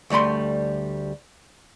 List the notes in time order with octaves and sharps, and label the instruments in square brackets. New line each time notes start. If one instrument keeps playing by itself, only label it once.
[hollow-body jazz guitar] D2 G3 A3 B5 C6